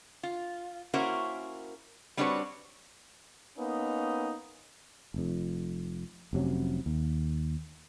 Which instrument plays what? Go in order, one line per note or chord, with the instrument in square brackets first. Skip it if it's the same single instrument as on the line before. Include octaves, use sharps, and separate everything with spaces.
[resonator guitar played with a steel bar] F4
A#3 C#4 E4 F#4 A#4 C5
G3 C4 D4 F#4 B4 C#5
[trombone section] A#3 B3 C#4 D#4
[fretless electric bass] F1 F2
F1 C3 F#3 C#4
D#2